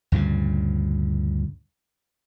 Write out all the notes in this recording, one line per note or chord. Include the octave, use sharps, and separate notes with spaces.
D2 G2 A#2 C#3